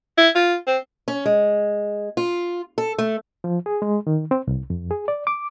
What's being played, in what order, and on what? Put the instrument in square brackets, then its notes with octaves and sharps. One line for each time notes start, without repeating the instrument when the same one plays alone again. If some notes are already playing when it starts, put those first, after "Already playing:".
[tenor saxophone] E4
F4
C4
[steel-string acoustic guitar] C#4
G#3
F4
A4
A3
[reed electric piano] F3
G#4
G#3
D#3
C4
C2
F2
G#4
D5
D6